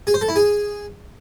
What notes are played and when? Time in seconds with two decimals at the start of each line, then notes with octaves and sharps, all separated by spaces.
0.07 G#4
0.14 C5
0.21 A4
0.29 E4
0.36 G#4